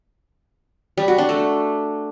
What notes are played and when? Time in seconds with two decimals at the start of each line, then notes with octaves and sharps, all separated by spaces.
0.97 G3
1.08 F#4
1.18 D4
1.29 A3